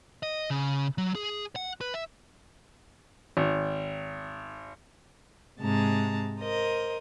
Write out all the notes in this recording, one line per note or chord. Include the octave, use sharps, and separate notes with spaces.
D#5
C#3
F#3
G#4
F#5
B4
E5
G#1
G#2 C3 G#3 A5 A#5
A#4 C5 D#5